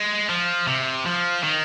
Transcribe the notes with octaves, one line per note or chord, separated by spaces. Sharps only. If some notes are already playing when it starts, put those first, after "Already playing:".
Already playing: G#3
F3
C3
F3
D#3